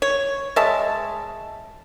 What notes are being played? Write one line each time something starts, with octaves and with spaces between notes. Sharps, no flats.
C#5
G#3 C#5 E5 A5